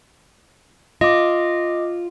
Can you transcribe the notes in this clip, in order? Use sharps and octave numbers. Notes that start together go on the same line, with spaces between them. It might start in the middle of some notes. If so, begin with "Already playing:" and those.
F4 D#5 D6